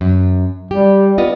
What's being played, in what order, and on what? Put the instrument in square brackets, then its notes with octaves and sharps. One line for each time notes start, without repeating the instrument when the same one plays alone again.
[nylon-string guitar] F#2
[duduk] G3 [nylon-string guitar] G4
[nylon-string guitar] B3 F4 D#5